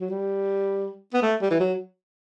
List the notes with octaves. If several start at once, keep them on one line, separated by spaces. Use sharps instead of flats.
F#3
G3
B3
A3
G3
E3
F#3